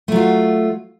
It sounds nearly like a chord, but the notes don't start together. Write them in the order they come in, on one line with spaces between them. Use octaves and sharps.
A3 F#3 F4